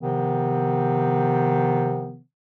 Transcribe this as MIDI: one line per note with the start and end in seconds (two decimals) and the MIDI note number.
0.02 2.19 48
0.02 2.19 51
0.02 2.19 53
0.02 2.19 59